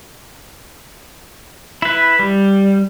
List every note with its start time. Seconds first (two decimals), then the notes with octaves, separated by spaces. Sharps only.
1.82 E4 B4
2.19 G3